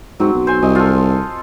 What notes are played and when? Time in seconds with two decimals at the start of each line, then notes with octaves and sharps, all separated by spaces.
0.20 G#2 F#3 C4
0.34 B1
0.47 C5 G#5
0.62 C2 D#5 G#5
0.75 F4 A4